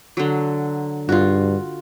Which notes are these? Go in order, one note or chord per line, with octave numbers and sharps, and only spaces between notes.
D3 F#3
G2 F4 F#4